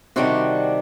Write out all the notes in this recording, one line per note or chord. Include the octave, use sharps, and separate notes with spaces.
C3 D#3 G3 D4 F#4